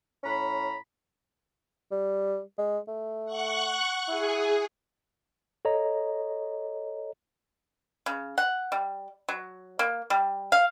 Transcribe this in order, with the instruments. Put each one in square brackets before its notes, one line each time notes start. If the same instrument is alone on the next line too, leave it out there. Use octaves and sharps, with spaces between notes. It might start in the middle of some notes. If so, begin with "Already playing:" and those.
[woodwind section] A2 C#4 A#5 B5
[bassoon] G3
G#3
A3
[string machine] F#5 C#6 F#6
[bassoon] E4 [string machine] G#4
[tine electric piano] A4 C#5 D#5 A#5
[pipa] C#3
F#5
G3
F#3
A#3
G3
F5